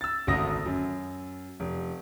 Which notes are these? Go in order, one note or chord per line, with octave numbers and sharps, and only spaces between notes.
E6 A6
G#1 D2 A3 D#6 A#6
F#2
F1